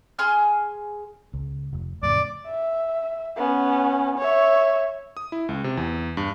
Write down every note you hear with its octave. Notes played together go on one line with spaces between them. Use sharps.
G#4 G#5 C6 F6
C#2
F1
F2 A2 C#3 D5
E5
B3 C#4
C#5 E5
D#6
E4
C#2
C3
E2
G2